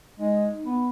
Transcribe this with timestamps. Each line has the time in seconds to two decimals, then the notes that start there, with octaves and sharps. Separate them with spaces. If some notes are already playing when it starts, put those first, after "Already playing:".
0.20 G#3 D#4
0.66 B3